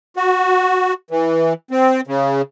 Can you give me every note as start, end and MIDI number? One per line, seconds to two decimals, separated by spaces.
0.16 0.93 66
1.11 1.53 52
1.71 2.01 60
2.07 2.42 49